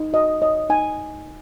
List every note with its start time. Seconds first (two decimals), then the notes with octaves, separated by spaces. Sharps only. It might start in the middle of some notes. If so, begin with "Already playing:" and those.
Already playing: D#4
0.13 F#4 D#5
0.42 C#5 D#5
0.70 D#4 G#5